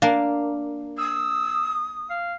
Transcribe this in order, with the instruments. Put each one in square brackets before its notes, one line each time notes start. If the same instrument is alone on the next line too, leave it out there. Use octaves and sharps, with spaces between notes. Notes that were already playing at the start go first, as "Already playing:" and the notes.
[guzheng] A#3 D4 [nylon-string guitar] F5
[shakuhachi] D#6 [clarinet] E6
[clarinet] F5